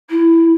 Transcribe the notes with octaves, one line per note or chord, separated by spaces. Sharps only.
E4